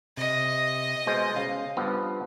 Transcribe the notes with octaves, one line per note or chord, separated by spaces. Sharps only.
C3 D#5
B2 G#3 C5
C#3 F5
G2 F3 B3